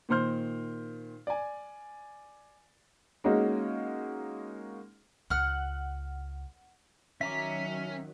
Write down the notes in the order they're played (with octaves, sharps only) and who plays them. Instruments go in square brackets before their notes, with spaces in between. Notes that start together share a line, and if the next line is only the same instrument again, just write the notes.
[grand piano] A#2 D#3 C5 C6 F6 G6
D5 G#5
[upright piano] G#3 A#3 C#4 D#4 F#4
[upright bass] C#2 [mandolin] F#5 F6
[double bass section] D#3 F#3 [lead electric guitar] C#4 [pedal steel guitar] E5 A#5 D6 [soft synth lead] B6